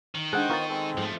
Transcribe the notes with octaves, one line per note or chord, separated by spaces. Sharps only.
D#3
G#3 D4 A4 C5 D#5 F#5 G5 F#6
B3 F4 A#4 C#6 A6
G#3 C4 A4
G#2 F3 A3